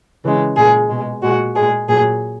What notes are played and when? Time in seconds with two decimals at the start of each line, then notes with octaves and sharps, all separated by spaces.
0.24 C#3 E3 G#3
0.57 A#2 G#3 G#4
0.89 B2 G#3
1.22 A#2 G#3 F#4
1.55 A#2 G#3 G#4
1.88 A#2 F#3 G#4